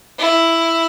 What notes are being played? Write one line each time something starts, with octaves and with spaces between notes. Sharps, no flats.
E4